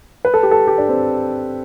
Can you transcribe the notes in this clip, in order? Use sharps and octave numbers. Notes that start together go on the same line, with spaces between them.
B4
A4
G4
A4
G4
D4
C4